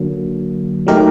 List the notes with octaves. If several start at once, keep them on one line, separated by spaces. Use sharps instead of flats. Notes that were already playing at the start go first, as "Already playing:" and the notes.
Already playing: D3 F#3 A#3
F#3 A3 D#4 G4 A#4